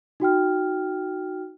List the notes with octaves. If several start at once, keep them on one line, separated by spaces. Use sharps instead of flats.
D#4 F#4 G5 F6